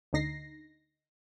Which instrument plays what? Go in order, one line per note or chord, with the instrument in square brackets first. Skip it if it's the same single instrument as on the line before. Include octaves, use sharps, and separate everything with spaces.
[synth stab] D2 D3 D#4 A#6 C7